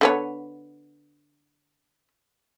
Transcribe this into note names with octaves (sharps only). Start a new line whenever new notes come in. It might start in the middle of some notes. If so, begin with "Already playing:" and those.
D3 B3 C#5